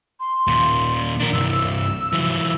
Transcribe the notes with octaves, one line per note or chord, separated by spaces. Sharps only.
C6
D#2 A#2
D4 A#4
C2 G2 E6
E3 F#3